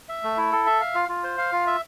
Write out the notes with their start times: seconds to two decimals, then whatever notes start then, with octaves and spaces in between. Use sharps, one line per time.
0.09 E5
0.23 A3
0.37 E4
0.52 A4
0.66 E5
0.80 F5
0.95 F4
1.09 F4
1.24 C5
1.38 F5
1.52 F4
1.67 E5